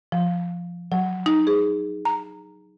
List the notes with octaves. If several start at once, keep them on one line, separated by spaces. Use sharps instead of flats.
F3
F#3
D#4
G#4
A#5